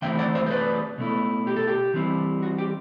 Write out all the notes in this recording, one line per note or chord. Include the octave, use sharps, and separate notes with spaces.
E3 A3 C4 E4 E5 G5
D5 F#5
C5 E5
C5
B4 D5
B2 A3 E4
G4
A4
G4
E3 G3 C4 E4
F#4
G4